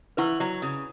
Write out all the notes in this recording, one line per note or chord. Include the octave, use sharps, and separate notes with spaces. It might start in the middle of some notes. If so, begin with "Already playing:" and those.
E3 E4 B4 F#5 C#6
F#3
C#3